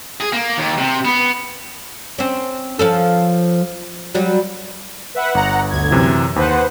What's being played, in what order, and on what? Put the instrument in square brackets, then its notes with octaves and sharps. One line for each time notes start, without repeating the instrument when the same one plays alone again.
[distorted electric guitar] G#4
A#3
D#2
C3
B3
[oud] C4 C#4
F3 C#4 A4
F#3 G3
[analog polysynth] B4 E5 F#5
[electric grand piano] G1 [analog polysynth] F#5 A#5
[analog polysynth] D2 G#6
[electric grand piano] F#2 C3 E3
[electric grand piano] D#2 [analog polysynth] B4 C5 F#5